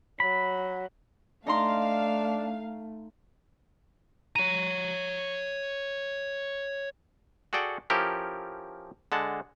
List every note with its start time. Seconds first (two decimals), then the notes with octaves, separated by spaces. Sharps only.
0.20 F#3 B5
1.47 A3 D4 D#4 F5 A#5 C6
4.36 C#5 A#5 D#7
7.53 F#4 G#4 A4 D5 F#5 G5
7.90 F3 C#4 E4 G4 A4 A#4
9.12 D3 G#3 F#5 A5